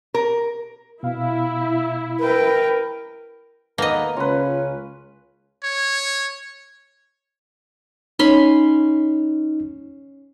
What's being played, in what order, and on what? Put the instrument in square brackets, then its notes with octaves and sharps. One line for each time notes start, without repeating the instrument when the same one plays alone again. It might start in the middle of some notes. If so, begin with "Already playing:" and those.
[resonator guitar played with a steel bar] A#4
[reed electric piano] B2 F5 [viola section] E4
[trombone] A#4 [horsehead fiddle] B4 G5
[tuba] D#2 [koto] A#3 D#5 [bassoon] B3 [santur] A#5
[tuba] C#2 [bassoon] C#4 [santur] F4 B4
[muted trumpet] C#5
[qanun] C#4 B5 C6 [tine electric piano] D#4